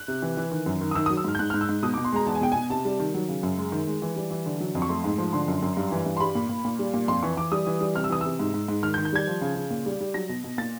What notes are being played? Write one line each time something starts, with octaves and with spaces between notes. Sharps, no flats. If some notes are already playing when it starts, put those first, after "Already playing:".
Already playing: F#6
C3
E3
E3
D#3
F#2
D#3
D#6
D#3 E6
D#6
F#3
E6
G#2 F6
G6
G#2 F#6
F6
G#2
E6
G#2
B2 D#6
D6
B2
C6
G#3 A#5
E2 A5
G#5
B2 G5
B2 G#5
C3 A5
G3
D#3
F#3
C#3
F#2
G#3
D#3
G#3
E3
G3
E3
D3
F#3
F2
C#6
A3 C6
G#2
F3
D3 C6
F#2
F#2
G2
E3
G2
C6
G3 B5
A#2
A#2
A#2
G3
A#2
F2 C6
E3 C#6
E3 D6
G3 D#6
E3
G3
C3 F6
E6
E3 D#6
C3 E6
G#2
G#2
G#2
D#3 F6
G6
D#3
G6
G3 G#6
F3
C#3
C#3
A#2
G3
G3
F#3 A#6
B2
B2
A#2 A6